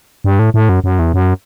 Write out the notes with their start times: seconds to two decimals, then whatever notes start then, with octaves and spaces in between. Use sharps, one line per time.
0.24 G2
0.39 A2
0.54 A2
0.69 F#2
0.84 F#2
0.99 E2
1.14 F#2